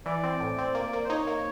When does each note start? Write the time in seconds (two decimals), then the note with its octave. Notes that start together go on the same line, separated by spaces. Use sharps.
0.06 E3 D5
0.24 C4
0.40 A2
0.58 C4
0.75 A#3
0.93 A#3
1.04 C5
1.10 D#4 C#5
1.27 A#3